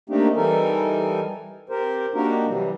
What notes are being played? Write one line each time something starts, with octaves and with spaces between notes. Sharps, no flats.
A3 A#3 C4 D4 D#4 G4
E3 G3 D#4 A4 A#4 G#5
C4 G4 A#4 C5
A#3 D4 D#4 F#4 G4 A#4
C3 E3 F#3 G3